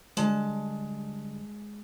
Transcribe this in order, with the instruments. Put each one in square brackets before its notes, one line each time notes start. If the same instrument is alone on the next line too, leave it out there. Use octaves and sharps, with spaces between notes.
[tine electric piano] D3 G3 [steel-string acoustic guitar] G#3 A5